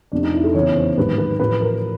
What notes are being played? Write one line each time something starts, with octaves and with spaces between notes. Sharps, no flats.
F1 F2 C3 D4
D#4
E4
A4
E2 C#3 E3 C#5
C5
A1 G#2 D#3 F#3 B4
B4
A1 A2 F3 B4
A#4